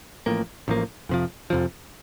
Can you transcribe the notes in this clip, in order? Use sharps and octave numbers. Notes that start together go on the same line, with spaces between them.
A1 A2 F3 A#3
A1 A2 F3 A#3
F2 C3 F3
F2 C3 F3